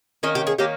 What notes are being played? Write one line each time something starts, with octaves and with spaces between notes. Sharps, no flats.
D#3 A#3 C#4 D#5
G4
G#4
D#3 A#3 C#4 G4